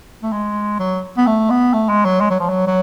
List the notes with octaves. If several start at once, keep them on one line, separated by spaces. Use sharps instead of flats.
A3
G#3
F#3
B3
A3
B3
A3
G#3
F#3
G#3
F#3
F3
F#3
F#3